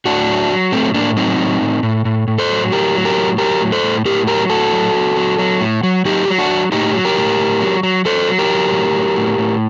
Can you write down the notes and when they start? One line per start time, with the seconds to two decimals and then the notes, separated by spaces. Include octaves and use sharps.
0.06 A2 D4 F#4
0.28 F#3
0.50 F#3
0.72 A2 A3 C4
0.94 A2 A#3 D4
1.16 F#3 C4 D#4
1.39 A2
1.61 A2
1.83 A2
2.05 A2
2.28 A2
2.38 A4 C5
2.50 F#3
2.72 A2 G4 A#4
2.94 F#3
3.05 G4 A#4
3.16 A2
3.38 F#3 G4 A#4
3.61 A2
3.72 A4 C5
3.83 A2
4.05 A2 G4 A#4
4.27 F#3 G4 A#4
4.50 A2 F#4 A4
4.72 F#3
4.94 F#3
5.16 F#3
5.39 F#3
5.61 A2
5.83 F#3
6.05 F#3 D#4 G4
6.28 F#3
6.39 D4 F#4
6.50 F#3
6.72 A2 D#4 G4
6.94 F#3
7.05 G4 A#4
7.17 A2
7.39 A2
7.61 F#3
7.83 F#3
8.05 F#3 A4 C5
8.28 F#3
8.38 G4 A#4
8.50 F#3
8.72 A2
8.94 F#3
9.16 A2
9.38 A2